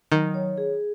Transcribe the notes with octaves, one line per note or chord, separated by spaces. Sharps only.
D#3 F#3
C#5
G#4